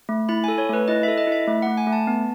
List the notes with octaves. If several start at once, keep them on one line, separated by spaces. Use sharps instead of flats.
A3
E4 B5
G#5
A4
C#5
A3 B4
E4 D#5
E5
A4
D#5
E4 E5
A3
F#5
A3
G#5
A3
A5
B3